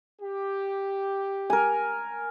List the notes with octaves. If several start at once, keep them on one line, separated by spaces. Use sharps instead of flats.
G4
A#4 G#5